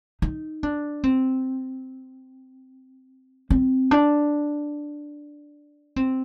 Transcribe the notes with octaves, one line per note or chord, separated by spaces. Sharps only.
D#4
D4
C4
C4
D4
C4